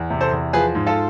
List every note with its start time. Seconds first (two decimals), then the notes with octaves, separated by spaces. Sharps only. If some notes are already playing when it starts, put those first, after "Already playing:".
Already playing: E2
0.10 C3
0.21 A4 C5
0.32 E2
0.53 F3 G#4 B4
0.75 G#2
0.87 F4 A4